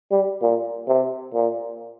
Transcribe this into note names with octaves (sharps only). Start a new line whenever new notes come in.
G3
A#2
C3
A#2